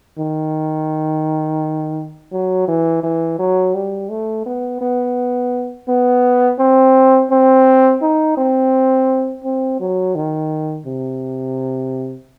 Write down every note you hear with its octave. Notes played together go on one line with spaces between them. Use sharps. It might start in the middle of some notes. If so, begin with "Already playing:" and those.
D#3
F#3
E3
E3
F#3
G3
A3
B3
B3
B3
C4
C4
D#4
C4
C4
F#3
D#3
C3